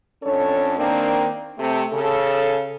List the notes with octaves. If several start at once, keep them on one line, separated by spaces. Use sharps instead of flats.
F2 C#4 D4 A4 C#5
D#3 A#3 C4 D4
C3 A3
C#3 A4